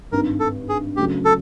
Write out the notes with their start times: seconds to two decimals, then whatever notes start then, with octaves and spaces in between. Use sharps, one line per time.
0.11 G#1 G2 D#3 A#4
0.40 A4
0.69 G#4
0.96 D2 C#3 F#3 G4
1.25 A4